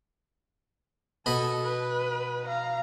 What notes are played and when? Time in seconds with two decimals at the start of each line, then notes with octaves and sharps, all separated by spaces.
1.26 B2 A4 D#5 B5
1.64 B4
2.45 F5 A#5